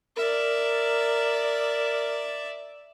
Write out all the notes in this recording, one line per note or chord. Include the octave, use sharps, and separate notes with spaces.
A#4 D5 E5